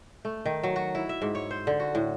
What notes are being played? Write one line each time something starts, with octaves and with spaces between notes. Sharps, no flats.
A3
D#3
F#3
F#4
E4
E5
G#2
C#5
C5
D3
F#4
A2